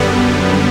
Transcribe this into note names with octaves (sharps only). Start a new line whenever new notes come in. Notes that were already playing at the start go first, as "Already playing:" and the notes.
Already playing: F#2 D3 G3 B3